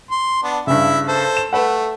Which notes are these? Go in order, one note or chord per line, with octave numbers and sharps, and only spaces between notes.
C6
B3 D4
G2 C#3 E4 E5
A4 C5
E7
A3 B4 F#5